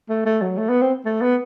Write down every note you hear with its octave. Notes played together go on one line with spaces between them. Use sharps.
A3
A3
F#3
A3
B3
C4
A3
B3